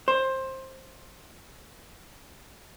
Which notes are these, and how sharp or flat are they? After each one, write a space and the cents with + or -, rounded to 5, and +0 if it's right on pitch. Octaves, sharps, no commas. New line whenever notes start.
C5 +15